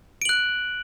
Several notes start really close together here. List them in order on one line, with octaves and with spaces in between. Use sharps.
D7 F#7 F#6